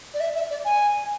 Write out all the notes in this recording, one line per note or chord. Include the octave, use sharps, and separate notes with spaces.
D5
E5
E5
D5
G#5